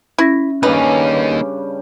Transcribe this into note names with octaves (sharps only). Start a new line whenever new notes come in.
C#4 E4 A#6
G2 C#3 G3 A#3 D#4 B4